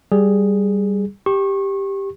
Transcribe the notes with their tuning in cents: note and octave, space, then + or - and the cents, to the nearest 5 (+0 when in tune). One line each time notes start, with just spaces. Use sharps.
G3 +0 G#4 +0
G4 +5 C#6 -30